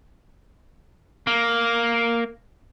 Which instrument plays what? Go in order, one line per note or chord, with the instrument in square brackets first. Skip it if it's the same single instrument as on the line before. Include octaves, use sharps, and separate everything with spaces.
[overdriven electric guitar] A#3